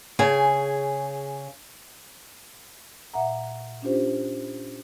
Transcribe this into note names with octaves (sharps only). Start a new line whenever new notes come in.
C#3 G#4 G#5
A#2 E5 F#5 A#5
C#4 D4 F4 G4 C5